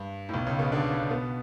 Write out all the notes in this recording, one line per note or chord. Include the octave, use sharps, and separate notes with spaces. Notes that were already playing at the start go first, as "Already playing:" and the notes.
Already playing: G2
A2
B1 B2
C#2 C#3
B2 B3
D3 D4
C#3 C#4
B2 B3